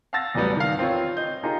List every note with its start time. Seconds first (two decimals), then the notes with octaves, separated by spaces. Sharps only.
0.13 F5 F#5 A5 E6 A6 A#6
0.35 E2 A2 F#3 G3 B3
0.56 D#3 F5
0.79 C4 F4 C#5
1.17 D#5 G6
1.43 D#4 F4 G4 G#4 A#4